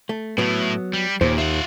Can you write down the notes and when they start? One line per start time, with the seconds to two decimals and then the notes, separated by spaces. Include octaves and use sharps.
0.09 A3
0.38 A2 F#3 A3 B3
0.93 G3
1.21 D#2 A#2 C5
1.38 F4 E5 F#5